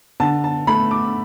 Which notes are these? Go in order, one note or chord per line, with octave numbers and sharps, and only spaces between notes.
D3 A5
A5
A3 B5
D6